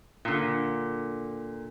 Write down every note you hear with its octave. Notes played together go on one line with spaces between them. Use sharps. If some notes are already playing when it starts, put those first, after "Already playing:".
A#2 D3